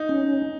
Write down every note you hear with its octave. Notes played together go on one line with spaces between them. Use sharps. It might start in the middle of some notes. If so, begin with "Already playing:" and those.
Already playing: D#4
C#4